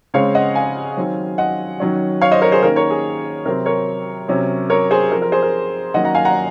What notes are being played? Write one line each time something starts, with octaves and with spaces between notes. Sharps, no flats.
C#3 G#3 C4 C#5 F5
D#5 F#5
F5 G#5
D#3 F#3 C4
D#5 F#5
D#3 F#3 C#4
C#5 F5
C5 D#5
A#4 C#5
G#4 C5
D#3 A#3 C#4 A#4
A#4 C#5
G#4
C3 F#3 C4 A#4
A#4 C#5
C3 F#3 C#4
A#4 C#5
G#4 C5
F3 C4 A#4
A#4
G#4 C5
A#4
D#3 F#3 A#3 C#4 D#5 F#5
F#5 A#5
F5 G#5
F#5 A#5